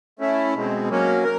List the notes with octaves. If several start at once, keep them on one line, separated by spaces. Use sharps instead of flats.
A3 C#4 E4
B2 G#3 C4
F#3 A#3 C#4
A#4